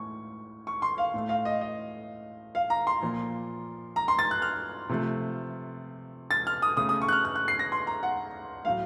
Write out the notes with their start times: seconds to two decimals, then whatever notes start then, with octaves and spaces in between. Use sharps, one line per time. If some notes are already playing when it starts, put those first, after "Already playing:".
Already playing: A2 C#6
0.67 C#6
0.82 C6
0.98 F5
1.14 A2 A3
1.29 F5
1.45 D#5
1.61 D#5
2.55 F5
2.70 A#5
2.87 C6
3.02 A#2 F3 A#3
3.96 A#5
4.08 C6
4.19 A6
4.31 F#6
4.42 F6
4.89 C3 F3 A3
6.31 A6
6.47 F6
6.62 D#6
6.77 C#3 A3 D#6
6.89 D#6
7.02 C#6
7.08 F#6
7.13 F6
7.25 F#6
7.36 F#6
7.48 C7
7.59 A#6
7.72 C6
7.87 A#5
8.03 F#5
8.65 A2 F#3 A3 F5